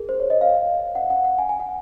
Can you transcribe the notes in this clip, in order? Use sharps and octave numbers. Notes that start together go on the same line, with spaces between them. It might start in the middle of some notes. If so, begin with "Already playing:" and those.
Already playing: G#4 A#4
C5
C#5
D#5
F5
F#5
F#5
F#5
G#5
G#5
F#5